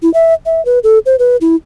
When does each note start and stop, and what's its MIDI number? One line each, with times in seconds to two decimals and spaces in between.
0.02 0.12 64
0.14 0.34 76
0.46 0.64 76
0.65 0.79 71
0.84 0.99 69
1.06 1.16 72
1.19 1.37 71
1.41 1.56 64